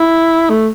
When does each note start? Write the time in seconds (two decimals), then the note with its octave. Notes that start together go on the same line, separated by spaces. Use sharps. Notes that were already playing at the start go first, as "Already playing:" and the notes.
Already playing: E4
0.50 A3